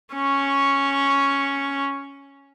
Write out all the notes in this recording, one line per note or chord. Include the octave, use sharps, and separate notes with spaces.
C#4 C#6